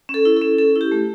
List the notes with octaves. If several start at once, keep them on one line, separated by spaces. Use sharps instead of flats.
C#4
A4
E4
C#4 A4
C#4 A4
E4
G4
A3